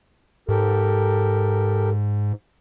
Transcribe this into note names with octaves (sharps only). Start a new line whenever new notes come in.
G#2 G4 A4 A#4